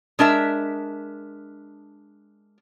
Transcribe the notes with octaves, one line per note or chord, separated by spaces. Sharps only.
G#3 D4 A#4 E5